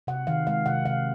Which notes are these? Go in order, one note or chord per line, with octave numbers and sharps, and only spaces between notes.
C3 F#5
D#3 F5
G#3 F5
C3 F#5
C3 F5